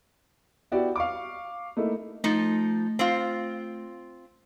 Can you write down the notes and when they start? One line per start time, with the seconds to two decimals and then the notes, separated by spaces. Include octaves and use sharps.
0.72 B3 E4 F#4 G4 D5
0.96 F5 C#6 D6
1.77 A3 A#3 D#4 E4
2.24 F3 A3 D#4
2.99 C4 F4